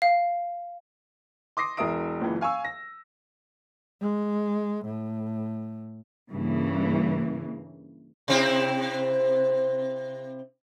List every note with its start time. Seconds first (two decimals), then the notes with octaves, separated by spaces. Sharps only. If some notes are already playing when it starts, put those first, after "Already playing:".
0.02 F5
1.57 C6 D6 D#6 A#6 C7
1.77 E1 E3 A#4 E5 D#6 D7
2.20 F#1 C#2 A#2 E3
2.41 F5 G#5 C#6 E6
2.65 A#6
4.01 G#3
4.85 A2
6.31 G2 C#3 E3 A#3
8.28 C3 C4 E4